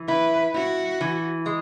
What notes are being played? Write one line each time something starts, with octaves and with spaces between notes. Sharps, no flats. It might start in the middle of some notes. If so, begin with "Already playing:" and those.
Already playing: E3
E4 B4
E4 F#4
E3
G#3